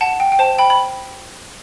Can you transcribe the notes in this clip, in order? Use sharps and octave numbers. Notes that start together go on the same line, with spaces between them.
F#5 A5
G5
G5
C5 A5
G5 B5
B5